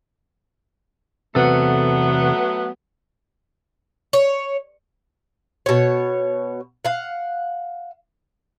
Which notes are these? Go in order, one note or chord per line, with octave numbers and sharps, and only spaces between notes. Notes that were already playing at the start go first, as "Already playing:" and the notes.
E2 C3 F#3 A3 B3 A4
C#5
B2 C#5
F5 F#5